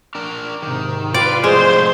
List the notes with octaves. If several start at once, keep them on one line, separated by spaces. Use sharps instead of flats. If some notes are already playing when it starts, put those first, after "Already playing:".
D4 A#4
G#2 C3 D#3
C3 F4 B4 D5
F2 A2 F#3 G#3 C5